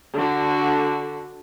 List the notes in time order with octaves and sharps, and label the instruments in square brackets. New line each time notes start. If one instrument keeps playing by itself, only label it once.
[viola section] D3 F#4